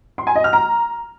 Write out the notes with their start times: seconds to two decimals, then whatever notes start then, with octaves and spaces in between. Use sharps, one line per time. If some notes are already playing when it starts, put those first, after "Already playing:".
0.18 C6
0.27 G#5
0.36 D#5
0.44 F6
0.53 A#5